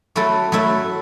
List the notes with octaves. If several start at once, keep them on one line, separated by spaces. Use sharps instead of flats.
F#3 A3 E4 A4
F#3 A3 E4 A4